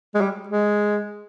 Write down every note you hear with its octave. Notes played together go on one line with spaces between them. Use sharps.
G#3
G3
G#3